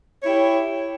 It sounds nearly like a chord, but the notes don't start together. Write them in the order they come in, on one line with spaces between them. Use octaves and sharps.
C#5 E4 G4